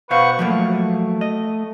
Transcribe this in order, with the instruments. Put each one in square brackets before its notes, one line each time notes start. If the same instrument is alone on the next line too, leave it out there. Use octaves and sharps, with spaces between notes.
[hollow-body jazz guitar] B2 C5 F5 [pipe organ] B4 F#5 C#6
[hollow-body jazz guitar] F3 F#3 A#3 [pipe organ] A3
[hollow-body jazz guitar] D#5